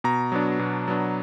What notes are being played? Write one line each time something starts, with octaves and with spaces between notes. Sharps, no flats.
B2 A#5
F#3 B3 D4
B2
F#3 B3 D4